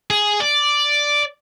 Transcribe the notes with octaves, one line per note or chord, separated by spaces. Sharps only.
G#4
D5